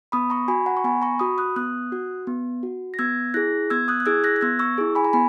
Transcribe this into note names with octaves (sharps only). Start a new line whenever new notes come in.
B3 B5 D#6
A#5 C#6
F#4 G#5 B5
F#5 A#5
C#6
B3 G#5 B5
A#5 C#6
F#4 B5 D#6
D#6 F#6
B3 D#6 F#6
F#4
B3
F#4
A#6
B3 E6 G#6
E4 G#4 F#6 A#6
B3 E6 G#6
D#6 F#6
F#6
E4 G#4 E6 G#6
F#6 A#6
A#6
B3 E6 G#6
C#6 E6
E4 G#4
G#5 B5
A#5
B3 G#5 B5